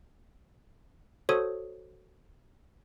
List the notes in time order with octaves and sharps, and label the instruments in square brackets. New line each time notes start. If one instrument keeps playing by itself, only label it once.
[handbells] F#4 A4 C5 C#5 D#6